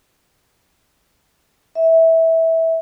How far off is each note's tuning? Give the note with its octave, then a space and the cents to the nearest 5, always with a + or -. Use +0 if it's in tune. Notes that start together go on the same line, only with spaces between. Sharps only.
E5 -15